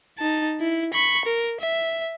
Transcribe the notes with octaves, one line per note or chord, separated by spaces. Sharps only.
D#4 A5
E4
B5 C#6
A#4
E5